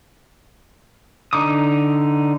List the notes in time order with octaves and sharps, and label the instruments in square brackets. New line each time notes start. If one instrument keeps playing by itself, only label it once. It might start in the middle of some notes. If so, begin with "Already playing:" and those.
[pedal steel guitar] D3 D#4 D6 D#6